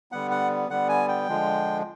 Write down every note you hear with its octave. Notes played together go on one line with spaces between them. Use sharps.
D3 G3 B3 F#5
F#5
D3 G3 B3 F#5
G#5
G5
D3 F3 G#3